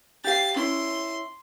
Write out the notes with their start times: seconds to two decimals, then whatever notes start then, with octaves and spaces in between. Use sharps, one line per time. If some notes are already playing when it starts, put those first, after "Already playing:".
0.24 G4 F5 A6 C7
0.56 C#4 E4 C6